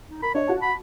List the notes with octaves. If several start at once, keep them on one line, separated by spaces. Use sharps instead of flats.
D#4
A#4 B5
D4 C#5 D#5
F#4 A5
B5